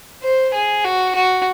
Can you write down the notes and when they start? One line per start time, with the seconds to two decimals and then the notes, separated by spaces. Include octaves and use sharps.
0.22 C5
0.54 G#4
0.84 F#4
1.16 F#4